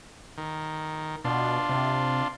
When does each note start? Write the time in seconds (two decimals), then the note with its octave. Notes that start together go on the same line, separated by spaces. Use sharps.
0.38 D#3
1.24 B2 D4 F4
1.69 C3